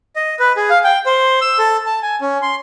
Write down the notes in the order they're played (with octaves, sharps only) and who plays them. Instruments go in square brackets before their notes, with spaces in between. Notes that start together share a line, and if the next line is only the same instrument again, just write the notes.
[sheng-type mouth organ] D#5
B4
G#4
F5
G5
C5
E6
A4
A5
G#5
C#4
C6